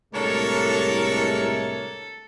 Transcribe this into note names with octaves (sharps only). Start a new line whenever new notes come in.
C2 A2 G#3 A3 D4 A4 A#4 C#5